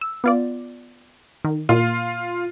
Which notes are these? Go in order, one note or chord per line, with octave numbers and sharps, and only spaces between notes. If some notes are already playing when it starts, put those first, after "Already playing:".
E6
B3 F4 D5
D#3
A#2 F4